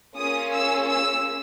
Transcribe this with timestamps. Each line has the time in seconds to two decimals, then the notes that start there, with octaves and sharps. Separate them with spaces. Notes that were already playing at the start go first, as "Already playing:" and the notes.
0.17 A#3 C#4 F4 G#4 D#6
0.53 E6
0.89 E6